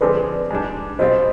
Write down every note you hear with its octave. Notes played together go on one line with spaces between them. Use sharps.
D3 F3 G#3 C4 G4 B4 D5
G#2 G3 D4
B2 G3 C4 F4 C5 D#5